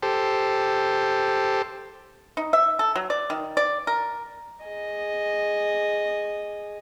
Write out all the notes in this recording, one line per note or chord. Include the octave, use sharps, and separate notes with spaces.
G4 A4 C5
D#4
E5
A4
F#3
D5
D#3
D5
A#4
G#4 D#5